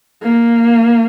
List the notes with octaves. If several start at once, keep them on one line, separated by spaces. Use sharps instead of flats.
A#3